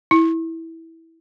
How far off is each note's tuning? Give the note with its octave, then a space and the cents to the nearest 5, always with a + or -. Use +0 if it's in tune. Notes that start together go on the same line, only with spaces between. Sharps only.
E4 -15